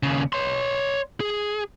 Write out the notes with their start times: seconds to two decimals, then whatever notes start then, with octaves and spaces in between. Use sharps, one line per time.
0.03 D#2 C#3
0.33 C#5 C6
1.20 G#4